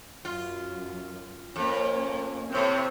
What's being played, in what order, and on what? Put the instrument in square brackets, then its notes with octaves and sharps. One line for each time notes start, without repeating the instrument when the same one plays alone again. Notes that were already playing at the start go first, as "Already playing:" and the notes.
[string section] F#2 [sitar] F4
[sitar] F2 [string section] A#3 C#4
[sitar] A2 C3 [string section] C4 C5 C#5